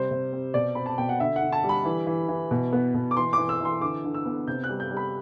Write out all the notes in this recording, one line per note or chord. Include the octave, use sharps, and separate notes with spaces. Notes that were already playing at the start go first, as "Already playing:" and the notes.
Already playing: C3 G3 C5
C3
C4
B2 D5
C4 B5
A5
B2 G5
F#5
D3 E5
F#5
D3
A5
G3
B5
E3
E3
E3
B2
B3
B2
D6
E3 C6
E3 D6
E6
E3 C6
D3 D6
D3
E6
B3
C3 G6
F#6
G3
G6
G3
B5